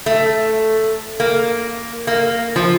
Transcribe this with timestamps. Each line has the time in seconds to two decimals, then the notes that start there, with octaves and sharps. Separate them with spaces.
0.06 A3
1.20 A#3
2.07 A#3
2.56 F3